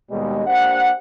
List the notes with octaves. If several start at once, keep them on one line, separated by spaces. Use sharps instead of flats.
D#2 B2 G3 G#3
A#3 D4 G4 C5 F#5